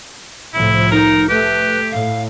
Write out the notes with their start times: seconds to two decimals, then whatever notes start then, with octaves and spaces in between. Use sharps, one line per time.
0.54 C2 A2 F3 E4
0.91 D#4 A#4
1.29 A3 G4 B4
1.91 A2 F5